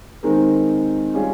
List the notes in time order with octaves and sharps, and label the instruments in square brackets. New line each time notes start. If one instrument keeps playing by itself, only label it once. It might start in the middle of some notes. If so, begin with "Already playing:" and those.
[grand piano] D#3 G#3 C4 D#4 A#4
G3 C#4 F4 G#4